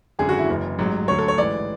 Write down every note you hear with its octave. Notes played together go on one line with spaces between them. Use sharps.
G#1 F#2 D3 G#4
F#4
E4
F#1 F#2 E3
A1 G#2 F#3
D2 D3 F#3 C#5
A4
C#5
A1 G#2 E3 D5